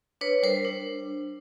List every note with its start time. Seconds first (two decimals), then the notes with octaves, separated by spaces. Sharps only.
0.21 D4 B4 C#5
0.43 G3 A#4 C5
0.65 D4